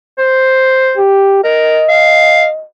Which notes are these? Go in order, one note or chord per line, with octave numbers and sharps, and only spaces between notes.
C5
G4
A#4 D#5
F5